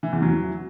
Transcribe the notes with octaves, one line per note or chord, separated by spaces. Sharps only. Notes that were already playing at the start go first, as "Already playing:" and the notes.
E3
E2
F#3